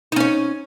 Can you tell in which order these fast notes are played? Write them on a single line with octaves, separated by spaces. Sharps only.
D#4 C#4 C#5